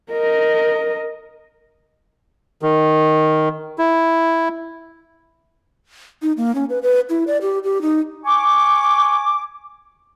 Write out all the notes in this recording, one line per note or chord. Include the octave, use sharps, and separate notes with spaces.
A#4 D#5
D#3
E4
D#4
A#3
C#4
B4
B4
E4
D5
G4
G4
D#4
G#5 C#6 D6